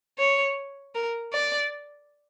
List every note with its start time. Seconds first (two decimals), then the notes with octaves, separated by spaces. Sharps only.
0.19 C#5
0.94 A#4
1.32 D5